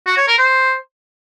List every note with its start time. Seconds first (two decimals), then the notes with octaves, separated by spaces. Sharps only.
0.06 F#4
0.17 C#5
0.28 A#4
0.38 C5